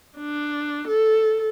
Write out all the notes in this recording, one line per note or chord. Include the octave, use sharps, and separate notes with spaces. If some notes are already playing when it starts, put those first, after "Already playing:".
D4
A4